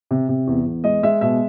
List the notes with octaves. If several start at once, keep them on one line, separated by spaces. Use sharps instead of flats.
C3
C3
E2
E2
G#3 D#5
G#3 E5
B2 E5